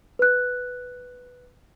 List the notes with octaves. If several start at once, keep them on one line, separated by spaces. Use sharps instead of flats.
B4 F#6